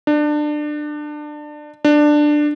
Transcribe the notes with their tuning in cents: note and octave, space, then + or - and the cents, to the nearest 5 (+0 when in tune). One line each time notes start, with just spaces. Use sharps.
D4 +25
D4 +15